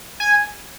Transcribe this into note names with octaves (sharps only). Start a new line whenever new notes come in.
G#5